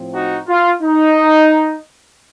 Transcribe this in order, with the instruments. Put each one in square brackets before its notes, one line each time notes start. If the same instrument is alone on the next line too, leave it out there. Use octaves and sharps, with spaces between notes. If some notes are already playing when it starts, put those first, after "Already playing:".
Already playing: [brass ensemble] A2 F3 C4
D#4 F#4
F4
D#4